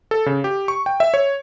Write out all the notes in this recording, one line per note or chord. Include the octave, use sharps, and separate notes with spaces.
A4
C#3
G4
C#6
G5
E5
C#5